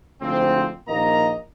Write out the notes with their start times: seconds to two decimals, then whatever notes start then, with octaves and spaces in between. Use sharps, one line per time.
0.22 D2 G#2 F3 C4
0.88 A#1 D#3 A#3 D#5 A#5